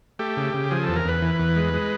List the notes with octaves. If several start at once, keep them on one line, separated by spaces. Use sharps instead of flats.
A3 G4
C#3
C#3
F3 G#4
E2 A4
A#4
E2 B4
E3
E2
G#3
G#3